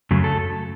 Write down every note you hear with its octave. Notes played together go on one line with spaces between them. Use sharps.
F#2 C#3 F#3 A3
A4